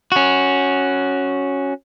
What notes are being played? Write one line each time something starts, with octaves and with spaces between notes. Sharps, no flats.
C#4 F#4